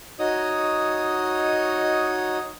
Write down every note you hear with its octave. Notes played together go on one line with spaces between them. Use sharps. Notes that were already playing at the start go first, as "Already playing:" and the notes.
D#4 F#4 C#5 D#5 D#6